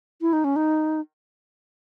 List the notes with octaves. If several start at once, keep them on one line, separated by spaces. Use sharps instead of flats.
E4
D#4
C#4
D#4